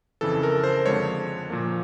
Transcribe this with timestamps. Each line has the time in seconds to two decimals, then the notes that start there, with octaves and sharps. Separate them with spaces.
0.21 F2 C#3 E3 A4
0.43 A#4
0.64 C5
0.86 F2 D3 F3 G#3 C#5
1.50 A#2 F3 A#3